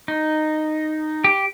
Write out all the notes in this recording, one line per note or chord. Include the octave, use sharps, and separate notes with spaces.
D#4
G4